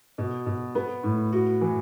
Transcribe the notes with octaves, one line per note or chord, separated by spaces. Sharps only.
B2
B2
B3
A2
F#4
E3